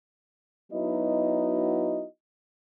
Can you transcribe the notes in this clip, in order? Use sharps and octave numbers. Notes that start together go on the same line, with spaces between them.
F#3 B3 D#4 E4 F#4 D#5